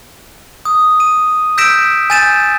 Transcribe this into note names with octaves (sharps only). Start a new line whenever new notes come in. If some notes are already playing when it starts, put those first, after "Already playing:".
D#6
D#7
E6 G6 A#6 B6 D7 E7
G#5 G6 A6 D#7 E7